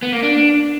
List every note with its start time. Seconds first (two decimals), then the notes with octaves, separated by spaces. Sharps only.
0.03 B3
0.12 A#3
0.22 D4